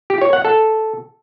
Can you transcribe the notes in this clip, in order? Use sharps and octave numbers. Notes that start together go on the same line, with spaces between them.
G4
C#5
F#5
A4